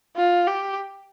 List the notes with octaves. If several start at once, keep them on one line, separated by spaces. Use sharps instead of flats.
F4
G4